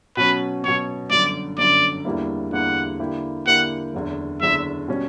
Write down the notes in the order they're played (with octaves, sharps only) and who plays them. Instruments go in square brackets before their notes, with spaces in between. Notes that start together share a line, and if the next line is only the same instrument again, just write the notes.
[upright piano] B2 F#3 C#4 [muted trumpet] B4
[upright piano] B2 F#3 C#4 [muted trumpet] C#5
[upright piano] G1 F#2 D3 [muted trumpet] D5
[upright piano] G1 F#2 D3 [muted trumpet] D5
[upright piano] E2 D3 G3 A#3 E4
[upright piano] E2 D3 G3 A#3 E4 [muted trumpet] F#5
[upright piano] D3 A#3 E4 G4
[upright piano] D3 A#3 E4 G4 [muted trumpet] F#5
[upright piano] F#1 E2 D3
[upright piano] F#1 E2 D3 [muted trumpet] E5
[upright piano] B2 G3 C#4